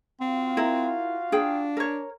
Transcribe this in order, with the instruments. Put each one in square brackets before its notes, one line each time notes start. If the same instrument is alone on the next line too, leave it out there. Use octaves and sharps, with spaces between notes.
[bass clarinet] C4 [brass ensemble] F4 F#4 F5
[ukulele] E4 A#4
[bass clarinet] D4 [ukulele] G#4 G5
[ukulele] A#4 C#5